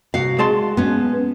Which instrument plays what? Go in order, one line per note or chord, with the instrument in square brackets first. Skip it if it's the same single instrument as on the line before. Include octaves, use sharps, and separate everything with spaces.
[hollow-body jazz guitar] C2 [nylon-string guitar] F#4 F5
[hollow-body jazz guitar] G#3 A5 C6
[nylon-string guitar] B3 C#4